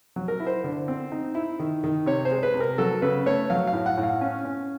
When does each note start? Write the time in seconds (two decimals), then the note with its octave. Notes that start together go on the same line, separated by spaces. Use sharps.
0.16 F#3
0.28 A#4
0.40 E4
0.47 C5
0.64 D3
0.88 C4
1.12 D#4
1.35 E4
1.59 D#3
1.84 D#3
2.06 C3 C#5
2.25 C5
2.31 G#3
2.43 B4
2.54 C3
2.60 A#4
2.78 F#3 A4
3.02 C#3 B4
3.26 A3 C#5
3.50 F#3 F5
3.67 F5
3.73 A2
3.86 F#5
3.97 A2
4.03 F5
4.21 C#4
4.45 C#4